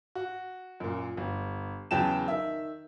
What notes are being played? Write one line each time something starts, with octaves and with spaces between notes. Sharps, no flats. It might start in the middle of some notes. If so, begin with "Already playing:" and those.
F#4
F#2 A#2
G1
E2 C#3 F#3 G5 A5 E7
D#3 E5